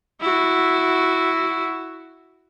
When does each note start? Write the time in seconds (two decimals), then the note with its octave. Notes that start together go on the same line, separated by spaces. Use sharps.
0.21 E4 F#4